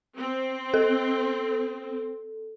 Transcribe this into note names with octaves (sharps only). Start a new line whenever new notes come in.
C4
A4